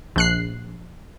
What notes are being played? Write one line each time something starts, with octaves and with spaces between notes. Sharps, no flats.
A#1 F#6 C7